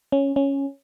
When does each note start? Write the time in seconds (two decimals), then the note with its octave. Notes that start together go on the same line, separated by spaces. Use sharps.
0.12 C#4
0.36 C#4